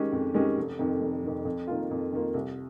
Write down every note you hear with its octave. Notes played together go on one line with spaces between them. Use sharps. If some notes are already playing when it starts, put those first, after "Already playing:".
Already playing: D#3 G#3 C#4 G4
F2
D#3 G#3 C#4 G4
F1
F2 D#3
F1
F2 D#3
F2
D#3 A#3 F4
F2
D#3 A#3 F4
C2